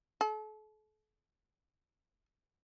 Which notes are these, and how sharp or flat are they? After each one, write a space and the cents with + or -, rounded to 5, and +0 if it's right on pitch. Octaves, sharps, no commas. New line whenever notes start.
A4 -40